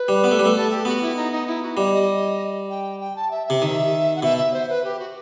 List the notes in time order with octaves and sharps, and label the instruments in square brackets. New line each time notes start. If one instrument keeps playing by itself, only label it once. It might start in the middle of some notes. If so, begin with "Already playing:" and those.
Already playing: [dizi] B4
[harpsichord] G3
B3
A3
G3
A3
[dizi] A4
G4
[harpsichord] B3 [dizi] F#4
[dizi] E4
D#4
D#4
E4
F#4
[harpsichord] G3 [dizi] D#5
[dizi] D#5
G5
G5
A5
E5
[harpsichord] C3 [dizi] E5
[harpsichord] D#3
[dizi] F#5
[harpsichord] B2 [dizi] E5
[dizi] E5
C5
B4
G4
F#4